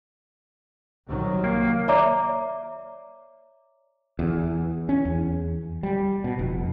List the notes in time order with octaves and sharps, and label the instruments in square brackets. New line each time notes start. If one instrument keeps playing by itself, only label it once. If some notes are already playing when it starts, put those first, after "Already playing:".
[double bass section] C2 D#3 F#3
[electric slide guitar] A#3
[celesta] C#5 D5 E5 A#5 D6
[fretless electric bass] E2
C#4
E2
G3
B2
F1